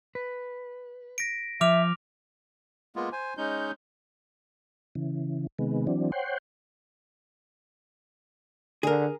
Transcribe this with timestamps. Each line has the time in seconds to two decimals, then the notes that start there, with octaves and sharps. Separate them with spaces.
0.15 B4
1.18 A#6 B6 D7
1.61 F3 E5 D6 F6 F7
2.96 G#3 A#3 B3 F4
3.12 C5 G#5
3.37 G#3 C#4 D#4 G6
4.95 C#3 E3
5.59 C3 D#3 G#3 B3
5.87 E3 F#3 C4 D4
6.12 C5 C#5 F#5 G5 C6
8.83 D3 G#4 A#4